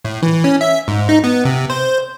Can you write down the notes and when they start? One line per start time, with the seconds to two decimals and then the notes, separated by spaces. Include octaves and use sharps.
0.05 A2
0.23 E3
0.44 C#4
0.61 E5
0.88 G#2
1.09 D#4
1.24 B3
1.45 C3
1.70 C5